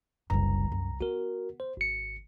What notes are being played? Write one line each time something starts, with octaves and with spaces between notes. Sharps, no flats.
F#1 C2 G3 A#5
F#2
B3 F#4 A#4
C5
G#1 C#7